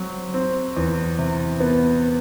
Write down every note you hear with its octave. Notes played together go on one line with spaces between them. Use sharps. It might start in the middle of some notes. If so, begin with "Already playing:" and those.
Already playing: F#3 C4
C4
E2
C3
B3